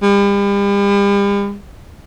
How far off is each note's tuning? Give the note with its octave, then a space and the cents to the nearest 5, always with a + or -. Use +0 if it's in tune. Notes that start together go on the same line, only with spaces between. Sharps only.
G3 +40